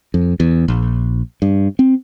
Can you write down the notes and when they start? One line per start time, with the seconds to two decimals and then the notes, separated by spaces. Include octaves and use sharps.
0.14 F2
0.40 E2
0.68 A#1
1.42 G2
1.79 C4